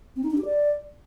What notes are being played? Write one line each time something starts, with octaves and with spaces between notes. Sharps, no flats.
C4
D#4
D4
G4
D5